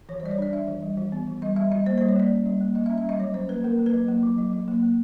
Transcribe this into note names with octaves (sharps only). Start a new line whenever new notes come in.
E3 C#5
C5
G3 D5
C#5
D4 D5
D4 E5
E3
G3
E3
B3
E3
G3 D#5
G3 E5
G3 D#5
A#3 C5
C5
G3
C#5
A#3 D5
C#4
G3
A#3
A#3 D#5
E5
C#4
E5
G3 D#5
F#3 C#5
C#4 C5
A#3 B4
A#3 A#4
A#3
B4
F#3
A#3
F#3
F#3
F#3
A#3
A#3